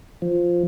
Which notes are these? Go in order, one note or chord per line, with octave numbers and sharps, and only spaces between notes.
F3